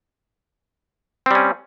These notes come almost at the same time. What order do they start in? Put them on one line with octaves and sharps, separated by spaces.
C4 G3 C#4